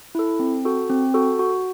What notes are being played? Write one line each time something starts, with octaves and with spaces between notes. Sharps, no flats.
E4 A4
C4
F#4 A4
C4
F#4 A4
F#4